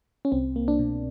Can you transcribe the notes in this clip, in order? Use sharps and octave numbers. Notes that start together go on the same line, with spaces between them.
C#4
C2 C4
A#3
D4
B2